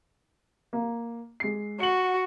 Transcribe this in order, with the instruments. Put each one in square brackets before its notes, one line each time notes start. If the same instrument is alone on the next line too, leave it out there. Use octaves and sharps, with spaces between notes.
[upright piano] A#3
G#3 C7
[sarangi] F#4 [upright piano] C#7 F#7